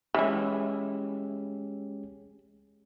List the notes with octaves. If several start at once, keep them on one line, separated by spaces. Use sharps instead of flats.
E3 G#3 C#4 G4 E5